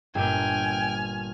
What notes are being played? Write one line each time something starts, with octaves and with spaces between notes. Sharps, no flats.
G1 A#2 G5 G#5 F6